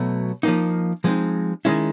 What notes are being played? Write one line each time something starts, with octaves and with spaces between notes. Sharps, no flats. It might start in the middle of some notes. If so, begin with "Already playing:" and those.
Already playing: B2 F#3 A3
F3 A#3 D#4
F3 G#3 C4 D#4
D#3 G#3 C#4 E4